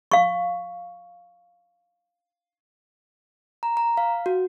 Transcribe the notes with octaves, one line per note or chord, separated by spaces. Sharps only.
F5 C#6
A#5
A#5
F5
F#4